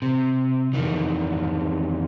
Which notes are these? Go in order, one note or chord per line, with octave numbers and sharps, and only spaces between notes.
C3
F2 D#3 E3